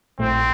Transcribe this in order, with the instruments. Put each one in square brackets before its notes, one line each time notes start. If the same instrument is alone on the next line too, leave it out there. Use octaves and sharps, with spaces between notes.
[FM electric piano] A#1 A2 A3 [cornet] C4